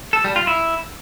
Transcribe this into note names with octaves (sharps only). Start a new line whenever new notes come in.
A4
G3
F4
E4